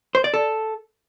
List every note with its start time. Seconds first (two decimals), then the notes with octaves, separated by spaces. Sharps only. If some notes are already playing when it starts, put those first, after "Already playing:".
0.15 C5
0.24 D5
0.34 A4